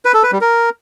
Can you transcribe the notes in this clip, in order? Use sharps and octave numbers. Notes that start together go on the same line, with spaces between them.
B4
A4
B4
G3
A#4